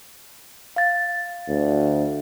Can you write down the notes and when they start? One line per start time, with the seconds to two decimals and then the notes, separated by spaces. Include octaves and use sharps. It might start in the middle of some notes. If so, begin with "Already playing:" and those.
0.76 F5 A6
1.48 D2